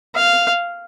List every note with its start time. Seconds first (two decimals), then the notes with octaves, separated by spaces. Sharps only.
0.15 F5